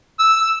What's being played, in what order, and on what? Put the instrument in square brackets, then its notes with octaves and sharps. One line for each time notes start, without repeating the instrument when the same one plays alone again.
[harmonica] E6